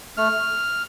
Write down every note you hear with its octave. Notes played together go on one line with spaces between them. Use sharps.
A3 F6